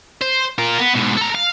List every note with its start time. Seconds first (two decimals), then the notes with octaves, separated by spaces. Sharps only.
0.22 C5
0.58 F4 A#4
0.79 B3
0.94 G#2 B2
1.17 A4 A#5
1.35 F5